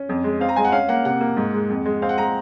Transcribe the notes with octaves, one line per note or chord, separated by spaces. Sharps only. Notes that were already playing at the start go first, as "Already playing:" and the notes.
Already playing: C#4
F2
G#3
C4 F5
A#5
G#3 G#5
F#5
C#4 F5
A#3 F#5
C3 F#5
A#3
G#2
G#3
F2
G#3
C4 F5
F#5
G#3 A#5